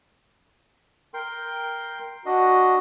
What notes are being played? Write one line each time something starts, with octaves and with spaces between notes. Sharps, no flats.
A#4 G5 C6
D4 F#4 D#5